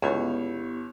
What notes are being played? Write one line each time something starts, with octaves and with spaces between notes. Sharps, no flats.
G1 C#2 B3 E4 G4 C#5